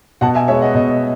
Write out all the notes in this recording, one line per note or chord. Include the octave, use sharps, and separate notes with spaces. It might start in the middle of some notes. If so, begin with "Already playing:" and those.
B2 F#5 A5
E5 G#5
G#3 B3 C#5 E5
D#5 F#5
B2 D#5